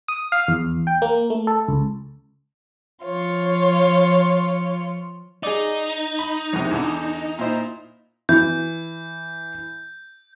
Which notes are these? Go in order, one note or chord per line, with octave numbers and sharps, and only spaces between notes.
D#6
F5
E2
G5
A#3
A3
A4
C#2
F3 F4 C#5
D#4 G#4 D5
B5
A#1 E2 C3
E2 D3
A#2 E4 C5
E3 G6